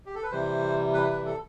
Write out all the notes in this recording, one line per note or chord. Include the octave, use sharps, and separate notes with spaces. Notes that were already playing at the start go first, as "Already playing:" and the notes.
G4
A4
B4
C3 E3 G3 C5
B4
B4
A4